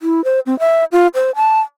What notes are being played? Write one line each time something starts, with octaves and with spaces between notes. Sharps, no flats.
E4
C5
C4
E5
F4
C5
A5